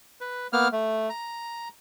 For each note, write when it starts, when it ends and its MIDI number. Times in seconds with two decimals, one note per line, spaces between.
0.21 0.47 71
0.53 0.68 58
0.53 0.68 59
0.53 0.68 89
0.72 1.09 57
1.10 1.68 82